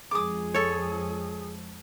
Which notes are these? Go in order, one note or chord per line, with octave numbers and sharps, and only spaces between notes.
F2 F3 G#3 G#4 D6 D#6
A4 C#5